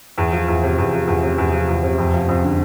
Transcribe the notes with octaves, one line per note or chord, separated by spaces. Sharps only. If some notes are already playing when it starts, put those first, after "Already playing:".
E2
F3
E2
C3
E2
F3
E2
C3
E2
F3
E2
C3
F2
F3
F2
D3